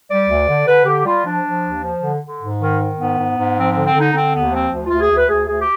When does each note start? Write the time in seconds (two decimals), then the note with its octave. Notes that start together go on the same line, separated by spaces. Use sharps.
0.08 G3 D5
0.28 D2
0.47 D3
0.66 D3 B4
0.85 D3 G4
1.05 G3 F4
1.24 F3 D4
1.43 F3
1.63 D#2
1.82 F3
2.01 D3
2.21 D3
2.41 G#2
2.60 D#3
2.79 D#3
2.98 G#2 B3
3.17 G#2
3.37 G#2
3.56 F3 C4
3.70 D3 C4
3.84 C4
3.94 D3 D#4
4.13 D3 C4
4.33 D#2 B3
4.52 F3 C4
4.72 D2
4.86 D2 F4
5.00 G#4
5.10 D2
5.15 B4
5.29 D2 G#4
5.46 D2 G#4
5.59 G4